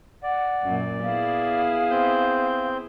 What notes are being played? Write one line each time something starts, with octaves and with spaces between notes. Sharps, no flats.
D5 F#5
F#2 A#2
B3 E4 G#4 F5
C4 G6